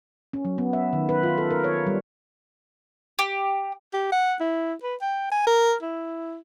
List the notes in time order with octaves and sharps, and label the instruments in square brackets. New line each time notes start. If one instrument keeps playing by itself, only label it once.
[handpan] C#4
F#3
B3
E5
D#3
B4
F4
A4
A#4
C#5
G3
[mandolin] G4
[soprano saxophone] G4
F#5
E4
B4
G5
G#5
A#4
E4